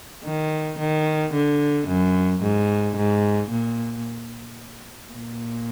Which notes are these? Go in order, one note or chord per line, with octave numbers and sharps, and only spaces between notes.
D#3
D#3
D3
F#2
G#2
G#2
A#2
A#2